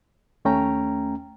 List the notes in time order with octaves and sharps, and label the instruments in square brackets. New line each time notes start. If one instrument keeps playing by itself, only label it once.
[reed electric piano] D#2 A3 C#4 G5 A#5